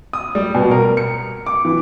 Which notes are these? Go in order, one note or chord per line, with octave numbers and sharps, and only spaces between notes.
D#6
G3
B2
A#4
C#7
D6
E3